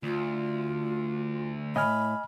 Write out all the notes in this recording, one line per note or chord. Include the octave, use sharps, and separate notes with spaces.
D2 F4
A2 D#5 G#5 B5 F6